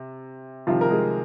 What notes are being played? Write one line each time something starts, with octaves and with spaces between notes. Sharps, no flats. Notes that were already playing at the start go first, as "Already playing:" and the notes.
Already playing: C3
C2 C3 D#3 F3 F4
A#4
G#3 G#4